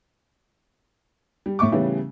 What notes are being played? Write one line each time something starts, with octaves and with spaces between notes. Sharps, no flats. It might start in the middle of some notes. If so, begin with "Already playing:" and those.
G3
A2 A3 E5 C#6 D6
C#3 E3 G3 A3 B3 C#4